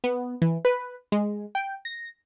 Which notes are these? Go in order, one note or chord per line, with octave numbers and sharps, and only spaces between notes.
B3
E3
B4
G#3
G5
A#6